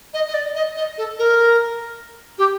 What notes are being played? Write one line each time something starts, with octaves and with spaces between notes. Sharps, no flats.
D#5
D#5
D5
D#5
D#5
A4
A#4
G4